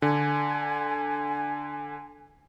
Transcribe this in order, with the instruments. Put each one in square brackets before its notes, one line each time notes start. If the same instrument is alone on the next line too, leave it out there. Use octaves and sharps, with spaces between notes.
[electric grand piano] D3 [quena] G#5